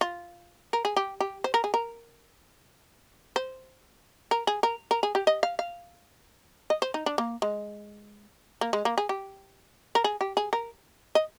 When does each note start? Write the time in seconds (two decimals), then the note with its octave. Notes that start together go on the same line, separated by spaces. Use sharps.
0.01 F4
0.73 A#4
0.85 G#4
0.96 G4
1.20 G4
1.44 C5
1.54 A#4
1.64 G#4
1.74 A#4
3.36 C5
4.31 A#4
4.47 G#4
4.63 A#4
4.91 A#4
5.03 G#4
5.15 G4
5.27 D#5
5.43 F5
5.59 F5
6.70 D#5
6.82 C5
6.94 D#4
7.06 D4
7.18 A#3
7.42 G#3
8.61 A#3
8.73 G#3
8.85 A#3
8.98 G#4
9.09 G4
9.95 A#4
10.04 G#4
10.21 G4
10.37 G#4
10.53 A#4
11.15 D#5